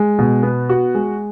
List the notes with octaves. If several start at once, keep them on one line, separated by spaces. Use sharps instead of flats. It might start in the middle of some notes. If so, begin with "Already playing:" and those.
Already playing: G#3
B2
B3
F#4
G#3